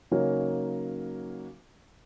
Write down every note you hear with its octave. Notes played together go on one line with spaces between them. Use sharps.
C#3 F#3 A#3 C#4 D#4 F#4